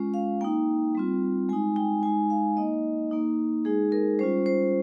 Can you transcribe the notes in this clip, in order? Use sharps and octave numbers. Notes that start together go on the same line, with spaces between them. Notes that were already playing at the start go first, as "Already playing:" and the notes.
Already playing: G#3 C#4 F4
F5
A#3 D#4 G5
G3 C4 F4
G#3 D#4 G#5
G5
G#3 D#4 G#5
F5
A#3 D#4 D#5
A#3 D#4
G#3 D#4 G#4
A#4
G3 C#4 F4 C5
C5